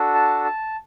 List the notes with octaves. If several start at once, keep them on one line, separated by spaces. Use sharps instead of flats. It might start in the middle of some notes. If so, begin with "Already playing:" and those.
Already playing: D4 F#4 A4
A5
A5